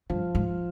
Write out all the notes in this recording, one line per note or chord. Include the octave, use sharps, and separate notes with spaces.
G2 F3
G#2